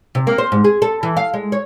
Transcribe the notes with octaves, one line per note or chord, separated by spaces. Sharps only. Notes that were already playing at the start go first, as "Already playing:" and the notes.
C3
A#3
C5
G#2
G#4
A4
E3
F5
G#3
C#5